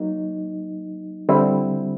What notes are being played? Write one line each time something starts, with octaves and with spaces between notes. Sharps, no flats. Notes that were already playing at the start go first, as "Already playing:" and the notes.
Already playing: F#3 A#3 D#4
D3 G3 C4 E4